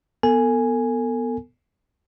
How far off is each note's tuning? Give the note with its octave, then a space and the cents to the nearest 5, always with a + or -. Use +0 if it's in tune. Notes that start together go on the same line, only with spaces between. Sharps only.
B3 -5 A4 +35 G#5 +0